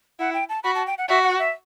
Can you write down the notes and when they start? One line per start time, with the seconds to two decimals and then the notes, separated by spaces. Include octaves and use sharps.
0.19 E4 F#5
0.34 G5
0.49 A5
0.63 F#4 B5
0.75 A5
0.87 G5
0.98 F#5
1.08 F#4 E5
1.23 F#5
1.39 E5